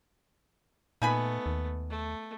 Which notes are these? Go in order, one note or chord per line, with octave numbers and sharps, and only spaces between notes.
A#2 A3 B3 D#4 G#5 B5
D#2
A3